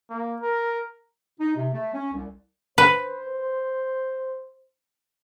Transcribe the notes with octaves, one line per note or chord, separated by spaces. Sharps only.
A#3
A#4
D#4
C3
A3
C#4
C2
B4 C5